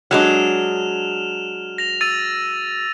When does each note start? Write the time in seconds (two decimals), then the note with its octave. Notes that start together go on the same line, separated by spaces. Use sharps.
0.11 F#3 G#3 D4 F6 E7 F7
1.78 A#6 F7
2.01 E6 A6 D#7